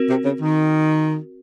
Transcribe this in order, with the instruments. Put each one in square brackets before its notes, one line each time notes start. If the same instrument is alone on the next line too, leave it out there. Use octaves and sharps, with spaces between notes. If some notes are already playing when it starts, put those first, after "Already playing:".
Already playing: [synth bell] C4 F#4 A#4
[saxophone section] C3
C#3
D#3